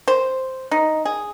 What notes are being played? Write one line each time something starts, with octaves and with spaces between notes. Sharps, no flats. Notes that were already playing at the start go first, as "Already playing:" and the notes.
C5
D#4
G#4